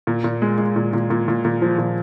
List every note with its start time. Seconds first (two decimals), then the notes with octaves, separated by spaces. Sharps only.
0.07 A#2
0.24 A#2
0.42 G#3
0.58 G#3
0.76 A#2
0.93 A#2
1.10 A#2
1.28 A#2
1.45 A#2
1.62 F3
1.78 A#2